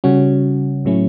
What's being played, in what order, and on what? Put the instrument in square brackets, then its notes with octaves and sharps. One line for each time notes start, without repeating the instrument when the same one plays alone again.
[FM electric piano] C#3 G3 C#4 F#4
A2 F#3 A3 C#4 E4